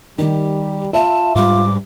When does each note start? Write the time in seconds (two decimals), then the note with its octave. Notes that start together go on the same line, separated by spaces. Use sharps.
0.18 D#3 G3 G4
0.93 F4 E5 A5
1.36 G#2 G3 F4 D6